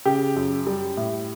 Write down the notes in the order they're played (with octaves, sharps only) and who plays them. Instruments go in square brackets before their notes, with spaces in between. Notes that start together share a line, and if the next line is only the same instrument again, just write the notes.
[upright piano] C#3 G4
F#2
G3
A2